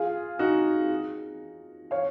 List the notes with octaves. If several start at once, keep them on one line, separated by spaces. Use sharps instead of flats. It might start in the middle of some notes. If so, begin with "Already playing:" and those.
Already playing: F4 G#4
D#4 F#4
C#5 F5